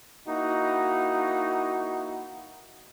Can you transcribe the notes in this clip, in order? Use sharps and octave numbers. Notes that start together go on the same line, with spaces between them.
A#3 D#4 E4 F#4